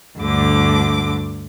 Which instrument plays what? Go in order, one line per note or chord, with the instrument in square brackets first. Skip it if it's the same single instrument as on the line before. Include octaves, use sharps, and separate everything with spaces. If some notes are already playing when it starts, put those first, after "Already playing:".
[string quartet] D2 G2 D3 D6